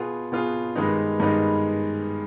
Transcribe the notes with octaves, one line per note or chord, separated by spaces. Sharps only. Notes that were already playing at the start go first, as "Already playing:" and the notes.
Already playing: B2 B3 F4 G#4
B2 B3 F4 G#4
G2 D#3 G#3 B3 D#4
G2 D#3 G#3 B3 D#4